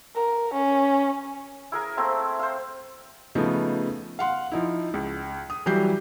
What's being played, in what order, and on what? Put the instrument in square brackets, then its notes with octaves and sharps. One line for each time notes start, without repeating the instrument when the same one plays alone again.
[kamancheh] A#4
C#4
[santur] E4 G#4 A#4 G#5
A3 A#3 C4 E4
C5 F5
[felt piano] C#3 F3 A3 B3 D#4
F5 F#5 C6
F3 D#4 E4
C#2
D#6
E3 F#3 G3 G4 G6 C7